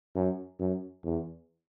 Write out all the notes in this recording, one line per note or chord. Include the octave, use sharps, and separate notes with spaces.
F#2
F#2
E2